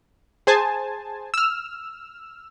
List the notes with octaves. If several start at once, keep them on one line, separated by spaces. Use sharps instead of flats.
G#4 C5 G#5 A5
E6 F6